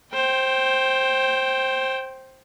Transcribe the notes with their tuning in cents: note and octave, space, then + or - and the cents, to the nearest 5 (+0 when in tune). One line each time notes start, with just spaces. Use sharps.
C5 +15 G5 -10